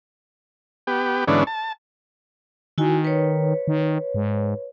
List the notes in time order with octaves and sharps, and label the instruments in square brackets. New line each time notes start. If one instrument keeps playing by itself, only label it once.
[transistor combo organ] B3 G4
G#2 D3 E3 B3 C#4 D4
A5
[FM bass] D#3 [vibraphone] E4 F#4 G#5
[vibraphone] B4 C#5
[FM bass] D#3
G#2